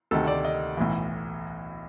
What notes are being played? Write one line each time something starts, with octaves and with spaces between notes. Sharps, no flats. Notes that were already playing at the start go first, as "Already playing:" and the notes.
D2 C3 D#3 A4
D5
D#5
B1 A2 E3